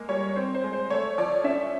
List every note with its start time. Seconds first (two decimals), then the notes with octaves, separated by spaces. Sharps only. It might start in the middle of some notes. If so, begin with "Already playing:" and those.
Already playing: G#3 A#3
0.09 G3 C#5
0.36 C4 C5
0.55 C5
0.64 G#3
0.73 C5
0.90 A3 C#5
1.18 F3 D5
1.44 C#4 E5